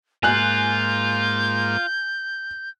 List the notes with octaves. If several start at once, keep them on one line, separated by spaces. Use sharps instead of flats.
G#2 A#3 F4 G#5 F#6 G6